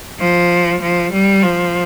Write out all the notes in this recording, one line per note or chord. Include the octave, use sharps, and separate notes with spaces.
F3
F3
G3
F3